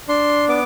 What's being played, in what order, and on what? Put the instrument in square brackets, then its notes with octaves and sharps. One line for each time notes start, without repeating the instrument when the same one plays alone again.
[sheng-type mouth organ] D4 C6
B3 D6